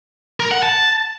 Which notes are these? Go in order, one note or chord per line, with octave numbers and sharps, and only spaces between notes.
A#4
F#5
A5